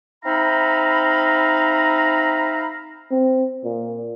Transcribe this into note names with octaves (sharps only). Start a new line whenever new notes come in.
C4 D#4 E5 F5 A#5 B5
C4
A#2